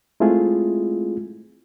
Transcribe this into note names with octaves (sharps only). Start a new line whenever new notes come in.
G#3 A3 C4 E4 F4 G#4